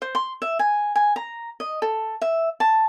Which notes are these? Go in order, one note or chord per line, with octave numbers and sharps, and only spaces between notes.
C5
C6
E5
G#5
G#5
A#5
D#5
A4
E5
A5